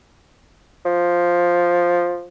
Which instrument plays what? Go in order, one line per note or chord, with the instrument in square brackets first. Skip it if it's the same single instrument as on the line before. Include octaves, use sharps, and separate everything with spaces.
[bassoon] F3